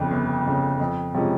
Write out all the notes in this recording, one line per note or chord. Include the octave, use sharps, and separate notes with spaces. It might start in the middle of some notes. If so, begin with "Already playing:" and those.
Already playing: G1 F2 C#3
G1
F2 C#3
F2
C3 F3 G#3 C#4